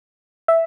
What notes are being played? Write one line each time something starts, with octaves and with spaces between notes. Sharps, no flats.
E5